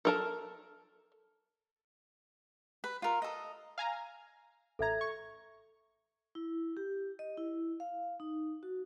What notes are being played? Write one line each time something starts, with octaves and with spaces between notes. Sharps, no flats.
A4 A#4 A5
B4
F4 A#4
A4 D#5
F5 G#5 A#5
A1 A4 E5 A#5 G#6
C#6
E4
G4
D#5
E4
F5
D#4
F#4